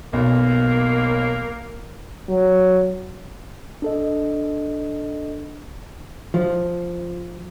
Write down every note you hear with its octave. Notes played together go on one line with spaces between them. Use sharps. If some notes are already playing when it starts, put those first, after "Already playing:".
B1 A#3
F#3
D4 A4 D#5
F3